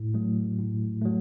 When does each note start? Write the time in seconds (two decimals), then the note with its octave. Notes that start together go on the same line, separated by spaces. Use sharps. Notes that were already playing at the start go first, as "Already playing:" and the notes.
Already playing: A2
0.14 F#3 A3
0.59 A2
1.02 F#3 A3